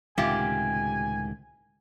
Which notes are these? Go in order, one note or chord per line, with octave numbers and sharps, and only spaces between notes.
C#2 A2 C3 D#3 F4 G4 G#5